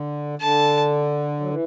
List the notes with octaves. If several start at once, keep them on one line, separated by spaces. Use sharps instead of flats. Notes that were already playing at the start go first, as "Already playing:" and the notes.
Already playing: D3
D3 A5
F#3
E3